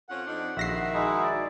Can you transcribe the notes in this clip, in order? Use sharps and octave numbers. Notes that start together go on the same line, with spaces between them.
F2 F3 C#4 F#5
F2 D4 D#4
A#1 D#3 F#4 E5 A#6 C7
G#3 D#4 E4
D5